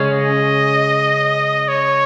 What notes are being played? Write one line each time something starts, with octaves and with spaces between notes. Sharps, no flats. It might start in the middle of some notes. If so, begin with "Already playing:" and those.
Already playing: C#3 G#3 C#4
D#5
C#5